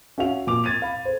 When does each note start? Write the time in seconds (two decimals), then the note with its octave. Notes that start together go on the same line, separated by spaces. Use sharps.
0.18 C#4 F#4 E5 F5 F7
0.47 A#2 D6 F7
0.64 G#6 A6 D#7 F7
0.82 F5 B5
1.05 A4 C5